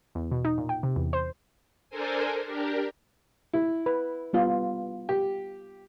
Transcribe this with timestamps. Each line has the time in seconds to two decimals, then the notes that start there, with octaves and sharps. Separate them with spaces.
0.15 E2
0.31 B2
0.45 D#4
0.58 A#2
0.69 G5
0.83 C3
0.96 E2
1.13 C5
1.90 D4 A4 A#4 C5 G#5
2.45 D4 G4 A#4
3.53 E4
3.86 B4
4.33 G3 B3 F4
5.09 G4